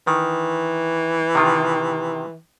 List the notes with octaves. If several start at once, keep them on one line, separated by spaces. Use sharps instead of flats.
D#3 E3
C3 D#3 F4